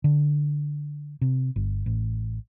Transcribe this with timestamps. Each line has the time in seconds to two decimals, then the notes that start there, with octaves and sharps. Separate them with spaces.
0.04 D3
1.21 C3
1.56 G1
1.86 A1